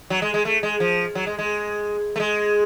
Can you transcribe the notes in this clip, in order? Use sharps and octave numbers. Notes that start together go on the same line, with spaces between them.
F#3
G#3
G#3
A3
G#3
F3
F#3
G#3
G#3
A3
G#3